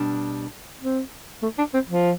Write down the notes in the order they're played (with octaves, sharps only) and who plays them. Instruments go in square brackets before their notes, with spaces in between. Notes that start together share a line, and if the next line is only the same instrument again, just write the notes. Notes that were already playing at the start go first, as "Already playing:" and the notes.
Already playing: [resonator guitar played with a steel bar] B2 G3 D4
[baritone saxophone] C4
A3
D4
C4
F3